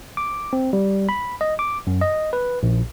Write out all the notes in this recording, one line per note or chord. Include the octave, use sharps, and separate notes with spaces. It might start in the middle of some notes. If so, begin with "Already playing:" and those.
D6
C4
G3
B5
D#5
D6
F#2
D#5
B4
A#1